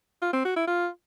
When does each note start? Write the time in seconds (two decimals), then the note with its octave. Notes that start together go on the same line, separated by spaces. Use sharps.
0.22 F4
0.33 C4
0.45 F#4
0.56 E4
0.67 F4